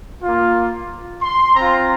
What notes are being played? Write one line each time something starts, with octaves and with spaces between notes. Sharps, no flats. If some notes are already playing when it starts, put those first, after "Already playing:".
A#3 F4
C6
C4 F4 A#5